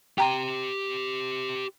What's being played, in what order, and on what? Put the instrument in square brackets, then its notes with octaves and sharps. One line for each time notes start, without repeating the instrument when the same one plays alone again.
[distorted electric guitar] G4 C6 [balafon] G5 A#5